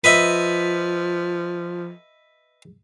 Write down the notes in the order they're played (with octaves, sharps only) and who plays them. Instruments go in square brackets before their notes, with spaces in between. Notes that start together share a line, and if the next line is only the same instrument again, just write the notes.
[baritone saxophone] F3 [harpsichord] B4 D#5 E5